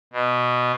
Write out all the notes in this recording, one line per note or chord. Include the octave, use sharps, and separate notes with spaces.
B2